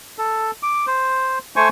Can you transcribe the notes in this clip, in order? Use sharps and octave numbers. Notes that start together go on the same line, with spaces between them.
A4
D6
C5
A3 C5 G#5 C#6